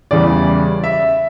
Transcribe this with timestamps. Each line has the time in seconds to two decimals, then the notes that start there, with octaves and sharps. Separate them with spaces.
0.11 E2 C#3 E3 G3 D5
0.84 E5